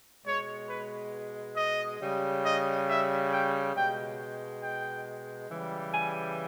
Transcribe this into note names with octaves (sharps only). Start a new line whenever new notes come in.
B2 G#3 C#5
B4
D#5
C#3 G3
D#5
E5
G5
B2 G#3 G5
G5
C#3 E3 G3
G#5